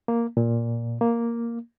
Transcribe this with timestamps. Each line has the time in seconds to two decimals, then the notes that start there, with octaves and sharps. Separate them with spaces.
0.08 A#3
0.37 A#2
1.01 A#3